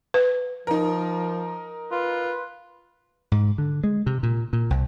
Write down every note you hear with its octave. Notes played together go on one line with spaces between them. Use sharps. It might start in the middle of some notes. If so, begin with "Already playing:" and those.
B4
F3 D#4 A#4
F4 B4
G#2
D3
G#3
C3
A#2
A#2
C2